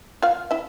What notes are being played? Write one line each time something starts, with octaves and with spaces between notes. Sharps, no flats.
F4 F5
E4 E5